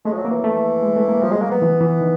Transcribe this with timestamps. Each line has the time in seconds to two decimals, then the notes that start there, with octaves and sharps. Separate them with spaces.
0.05 G#3 A3
0.13 F3
0.18 F#3
0.25 A#3
0.31 E3
0.44 A3
0.83 G#3
0.96 A3
1.09 A#3
1.22 F3 G3
1.32 G#3
1.42 F#3 A#3
1.51 B3
1.62 E3
1.80 E3
2.01 D#3